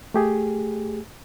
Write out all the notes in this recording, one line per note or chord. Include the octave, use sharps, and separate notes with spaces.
A3 G4 G#4